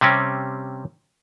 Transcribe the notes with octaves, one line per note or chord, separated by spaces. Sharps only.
C3 G3 C4 C#4